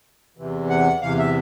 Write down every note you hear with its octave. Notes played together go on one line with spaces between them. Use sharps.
E2 C3 E3
F#5
E2 C3 E3 F5
E5